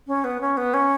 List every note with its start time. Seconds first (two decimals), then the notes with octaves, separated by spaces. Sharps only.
0.07 C#4
0.24 B3
0.41 C#4
0.57 B3
0.74 C#4